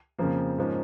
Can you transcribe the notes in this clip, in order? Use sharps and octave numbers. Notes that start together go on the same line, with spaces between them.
F2 C#3 F3 A#3
G#2 F3 A#3 C#4